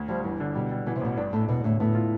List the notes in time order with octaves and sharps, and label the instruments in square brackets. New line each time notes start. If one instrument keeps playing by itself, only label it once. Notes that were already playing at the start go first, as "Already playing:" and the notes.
Already playing: [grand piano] D2
[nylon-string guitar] F3 [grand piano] G3
[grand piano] G1 [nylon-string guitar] E3
[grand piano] D3
[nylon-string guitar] B2 [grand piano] G3
[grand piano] G3
[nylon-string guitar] B2 [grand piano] E3
[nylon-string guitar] C3
[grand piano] A1 [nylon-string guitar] B2
[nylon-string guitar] G2 [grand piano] D4
[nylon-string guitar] A2 [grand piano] A3
[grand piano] E1 [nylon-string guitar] B2
[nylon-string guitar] A2 [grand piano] D3
[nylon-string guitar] A2 [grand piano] B3
[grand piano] F4